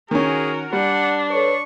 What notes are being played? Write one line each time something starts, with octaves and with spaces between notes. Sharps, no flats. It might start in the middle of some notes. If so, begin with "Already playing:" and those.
D#3 C#4 F#4 G#4 A#4
G3 D4 F#5
A4 B4 C#5 C#6